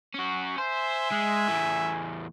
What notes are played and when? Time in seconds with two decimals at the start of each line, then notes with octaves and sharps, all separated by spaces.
0.14 C#4 F#4
0.58 C5 E5 G#5
1.12 G#3
1.48 E2 A2